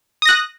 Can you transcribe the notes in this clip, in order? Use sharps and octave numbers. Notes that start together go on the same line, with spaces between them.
D#6 F#6 A#6